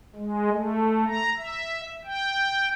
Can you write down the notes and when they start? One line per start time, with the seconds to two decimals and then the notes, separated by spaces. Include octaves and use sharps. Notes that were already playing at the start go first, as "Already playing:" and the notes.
0.16 G#3
0.50 A3
1.07 A#5
1.38 E5
2.05 G5